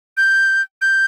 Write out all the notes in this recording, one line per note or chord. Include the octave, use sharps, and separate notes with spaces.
G6
G6